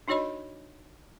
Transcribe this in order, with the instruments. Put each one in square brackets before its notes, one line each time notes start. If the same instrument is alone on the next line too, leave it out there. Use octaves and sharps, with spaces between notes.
[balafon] D4 D#4 F#4 C#5 D#5 B5